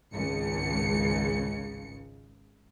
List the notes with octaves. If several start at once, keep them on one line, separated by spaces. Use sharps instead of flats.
G#1 C#2 C#3 C#7